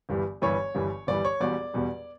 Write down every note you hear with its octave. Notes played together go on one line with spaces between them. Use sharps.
G1 G2 E3 G3
G1 G2 E3 G3 C#5
G1 G2 E3 G3
G1 G2 E3 G3 D5
C#5
E1 E2 B2 G3 D5
E1 E2 B2 G3